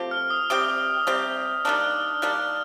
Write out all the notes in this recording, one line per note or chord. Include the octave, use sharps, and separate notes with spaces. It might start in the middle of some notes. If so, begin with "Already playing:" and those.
Already playing: F3 A3 C4 G4
F6
D#6
C3 G3 C4 G4 D#6
C3 G3 C4 G4
D#3 G3 A#3 D4 F6
D#3 G3 A#3 D4 F6